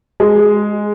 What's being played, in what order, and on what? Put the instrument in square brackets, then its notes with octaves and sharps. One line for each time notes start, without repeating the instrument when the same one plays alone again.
[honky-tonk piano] G#3